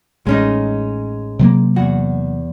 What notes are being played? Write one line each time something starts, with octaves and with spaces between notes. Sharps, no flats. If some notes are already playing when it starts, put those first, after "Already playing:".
A1 G#3 C#4 D#4
C3 F#3 A#3
E2 F#4